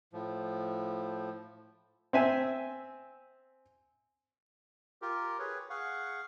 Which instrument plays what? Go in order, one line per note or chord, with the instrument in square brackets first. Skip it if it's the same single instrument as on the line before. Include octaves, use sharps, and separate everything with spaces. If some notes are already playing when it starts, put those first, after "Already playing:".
[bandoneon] A2 F3
[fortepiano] C4 E5 G#5
[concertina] F4 G4 A#4
G#4 B4 C#5
G#4 F5 F#5 C#6